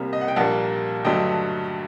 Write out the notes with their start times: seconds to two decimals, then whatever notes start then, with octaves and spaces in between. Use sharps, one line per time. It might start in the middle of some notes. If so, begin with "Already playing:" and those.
Already playing: C2 C3 G3 A#3 A#5
0.13 D#5
0.21 F#5
0.28 G5
0.36 A#1 A#2 G3 A#3 F#5 A5
1.05 G2 D3 F#3 A3 D#5 G5